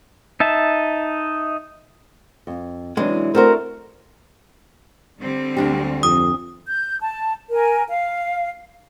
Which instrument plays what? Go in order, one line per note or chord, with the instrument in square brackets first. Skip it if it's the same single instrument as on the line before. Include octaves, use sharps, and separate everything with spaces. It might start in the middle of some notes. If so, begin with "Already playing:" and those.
[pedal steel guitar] D#4 E5 A5
[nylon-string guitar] F2
[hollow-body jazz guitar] C3 G#3 C#4 [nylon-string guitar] E3 F#3 D4
[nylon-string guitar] A3 D4 [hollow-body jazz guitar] C4 F#4 C5 [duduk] A#4
[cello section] D3 G3 C4
[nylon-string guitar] D2 D4 G4
[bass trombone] F2 [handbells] D#6
[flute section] G6
A5
A#4 G#5
F5